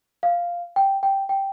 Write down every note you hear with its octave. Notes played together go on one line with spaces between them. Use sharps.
F5
G5
G5
G5